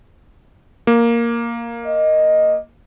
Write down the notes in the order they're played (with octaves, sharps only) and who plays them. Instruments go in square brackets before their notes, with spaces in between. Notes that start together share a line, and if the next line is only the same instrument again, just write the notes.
[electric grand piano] A#3
[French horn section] D#5